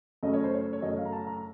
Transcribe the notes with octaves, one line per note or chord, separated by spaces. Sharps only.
F#2 C#3 A3 C#4 D#5
C#5
C5
C#5
C#5
F#2 C#3 A3 C#4 D#5
F5
A#5
A5
A#5